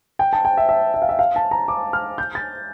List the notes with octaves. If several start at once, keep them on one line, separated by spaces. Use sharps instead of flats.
G5
A5
G5
E5
E5
E5
F5
E5
F5
A5
A#5
D6
F6
G6
A6